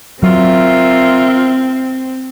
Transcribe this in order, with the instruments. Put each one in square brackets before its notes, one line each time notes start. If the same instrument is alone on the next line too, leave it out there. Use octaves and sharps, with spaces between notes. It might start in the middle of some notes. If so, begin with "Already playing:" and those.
[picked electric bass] F#3 [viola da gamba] C4 [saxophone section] F4 A#4 E5